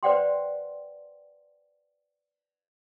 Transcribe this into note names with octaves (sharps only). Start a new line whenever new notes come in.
B4 C5 D5 F#5 G5 C6